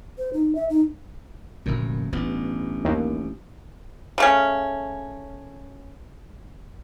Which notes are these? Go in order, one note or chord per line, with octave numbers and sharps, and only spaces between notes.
C5
D#4
E5
D#4
F1 F#2 A#2 D3
A1 G2 B3
D#2
C#3 A3 C#4